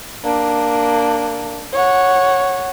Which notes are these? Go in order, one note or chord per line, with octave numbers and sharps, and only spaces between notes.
A#3 D4
C#5 F#5